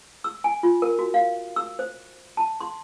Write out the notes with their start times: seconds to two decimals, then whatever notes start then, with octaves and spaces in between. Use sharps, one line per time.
0.24 E6
0.44 G#5
0.63 F4
0.82 A#4
0.99 F#4
1.14 F5
1.56 E6
1.79 C5
2.37 A5
2.61 C6